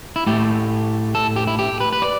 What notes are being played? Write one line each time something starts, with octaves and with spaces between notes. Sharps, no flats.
E4
A2 A3 G4
A4
G4
E4
G4
B4
B4
D5